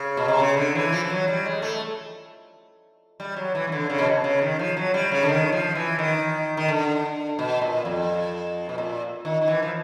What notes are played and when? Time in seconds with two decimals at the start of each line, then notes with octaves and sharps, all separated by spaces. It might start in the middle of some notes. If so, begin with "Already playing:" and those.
Already playing: C#3
0.17 B2
0.28 C3
0.40 C#3
0.57 D3
0.75 E3
0.92 F3
1.04 F3
1.10 F#3
1.28 G3
1.45 G#3
1.62 A3
3.20 G3
3.36 F#3
3.55 E3
3.67 C#3
3.72 D3
3.90 C#3
3.98 B2
4.07 C3
4.24 C#3
4.41 D#3
4.59 F3
4.77 F#3
4.94 G3
5.12 C#3
5.23 D3
5.29 D#3
5.52 F3
5.75 E3
5.99 D#3
6.57 D#3
6.68 D3
7.39 B2
7.62 A#2
7.85 F2
8.69 B2
8.78 A#2
9.25 D#3
9.42 D#3
9.48 E3
9.62 F3